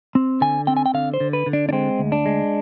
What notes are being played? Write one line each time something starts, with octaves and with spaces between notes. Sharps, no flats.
C4
D3 G#5
C4 G5
G#5
G5
D3 F5
C5
D3
B4
D3
D4
D4
G#3 C4
D2
D4
G#3